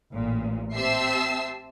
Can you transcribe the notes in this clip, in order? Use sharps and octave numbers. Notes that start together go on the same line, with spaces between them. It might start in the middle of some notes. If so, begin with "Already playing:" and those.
A1 A#2
C4 G4 E5 A5 E6 C7